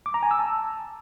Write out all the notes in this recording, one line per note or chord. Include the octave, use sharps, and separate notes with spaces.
D6
A#5
G#5
E6
A5